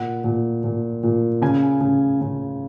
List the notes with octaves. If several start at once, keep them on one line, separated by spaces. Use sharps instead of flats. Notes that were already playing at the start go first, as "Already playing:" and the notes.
Already playing: A#2 F#5
A#2
A#2
A#2
C#3 G#5
C#3
C#3